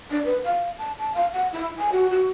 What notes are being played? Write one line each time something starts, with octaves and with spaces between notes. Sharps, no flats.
D4
B4
F5
A5
A5
F5
F#5
E4
G#5
F#4
F#4